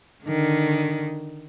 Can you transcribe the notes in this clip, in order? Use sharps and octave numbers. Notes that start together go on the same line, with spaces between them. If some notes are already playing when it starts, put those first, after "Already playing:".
D3 D#3